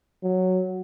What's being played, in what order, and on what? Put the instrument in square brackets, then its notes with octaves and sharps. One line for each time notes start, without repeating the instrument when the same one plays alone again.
[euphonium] F#3